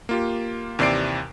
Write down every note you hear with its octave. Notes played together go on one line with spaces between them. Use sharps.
A#3 F4 G4
D#2 C3 E3 D5 C7 D7